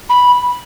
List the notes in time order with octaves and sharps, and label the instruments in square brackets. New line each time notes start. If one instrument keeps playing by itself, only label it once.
[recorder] B5